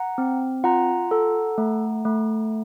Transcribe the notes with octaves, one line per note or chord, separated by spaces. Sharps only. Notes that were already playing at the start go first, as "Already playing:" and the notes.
Already playing: F#5 A#5
C4
F4 F#5 A#5
A4
A3
A3